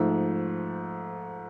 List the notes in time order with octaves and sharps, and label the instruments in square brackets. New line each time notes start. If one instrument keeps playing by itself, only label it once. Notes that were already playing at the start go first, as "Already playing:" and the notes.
Already playing: [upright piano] G#2 F3 A3